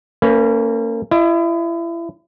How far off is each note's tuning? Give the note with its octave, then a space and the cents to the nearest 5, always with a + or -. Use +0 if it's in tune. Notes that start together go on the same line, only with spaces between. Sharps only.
A#3 -35 C#4 +0 B4 +0
E4 +35 D#5 +0